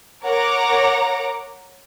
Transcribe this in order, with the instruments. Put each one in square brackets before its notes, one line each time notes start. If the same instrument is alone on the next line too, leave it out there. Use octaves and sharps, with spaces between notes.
[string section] A#4 C#5 F#5 A#5 D6